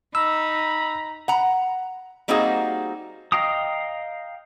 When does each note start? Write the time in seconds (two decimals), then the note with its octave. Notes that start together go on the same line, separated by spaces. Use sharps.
0.15 D#4 A#5 B5 E6
1.28 F#5 A#5
2.28 G3 A#3 C4 D#4 F#4 G#4
3.32 D#5 F5 G5 A#5 D#6